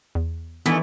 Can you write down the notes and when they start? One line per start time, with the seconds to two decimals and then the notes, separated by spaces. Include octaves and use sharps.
0.15 E2
0.66 G2 D#3 E3 A3 B3